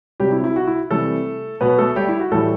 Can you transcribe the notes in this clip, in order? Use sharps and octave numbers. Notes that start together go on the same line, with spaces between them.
C3 F#3 G3 G4
E4
E4
F#4
E4
C3 E3 G3 A3 A4
B2 F#3 B3 B4
A3 A4
G3 G4
E4
F#4
A2 E3 G3 A3 A4